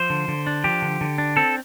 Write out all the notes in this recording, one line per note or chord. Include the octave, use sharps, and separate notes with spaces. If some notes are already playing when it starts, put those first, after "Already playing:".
Already playing: F3 C5
D3
D3
D4
F3 G4
D3
D3
D4
C4 A4